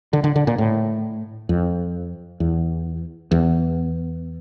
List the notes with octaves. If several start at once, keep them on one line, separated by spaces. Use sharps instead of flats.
D3
D3
D3
A#2
A2
F2
E2
E2